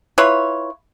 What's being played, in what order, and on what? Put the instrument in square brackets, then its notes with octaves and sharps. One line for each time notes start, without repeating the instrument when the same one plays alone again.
[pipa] E4 F4 B4 C#5